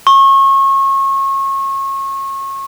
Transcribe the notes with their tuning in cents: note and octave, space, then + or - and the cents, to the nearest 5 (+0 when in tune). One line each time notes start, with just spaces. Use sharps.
C#6 -30